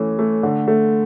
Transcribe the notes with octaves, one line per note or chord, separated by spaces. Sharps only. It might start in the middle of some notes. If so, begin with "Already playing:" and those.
Already playing: E3 A3 C#4
A3
D3
A3